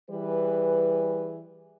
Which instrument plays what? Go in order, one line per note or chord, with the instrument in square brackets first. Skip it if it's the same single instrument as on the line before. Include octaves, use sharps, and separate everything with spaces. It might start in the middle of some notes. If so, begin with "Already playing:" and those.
[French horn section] E3 G3 G#4 B4